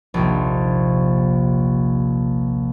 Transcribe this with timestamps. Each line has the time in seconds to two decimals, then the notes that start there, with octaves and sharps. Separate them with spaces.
0.14 A#1 D#2 C3